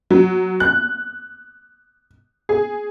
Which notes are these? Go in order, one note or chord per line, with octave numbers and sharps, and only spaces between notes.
F#3
F#6
G#4